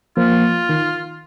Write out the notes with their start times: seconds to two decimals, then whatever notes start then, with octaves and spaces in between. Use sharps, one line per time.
0.17 F3 A#3 F4
0.69 D#3